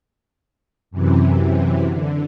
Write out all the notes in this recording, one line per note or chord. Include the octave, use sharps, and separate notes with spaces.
F#2 C3 E3
D3